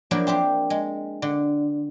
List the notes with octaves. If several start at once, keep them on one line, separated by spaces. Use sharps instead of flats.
F3 F#3 A#3 D4 E4
C4 D4 G4 C5
G#3
D3